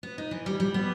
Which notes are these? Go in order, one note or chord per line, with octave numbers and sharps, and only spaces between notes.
B3
D#4
E3
G3
G3
B3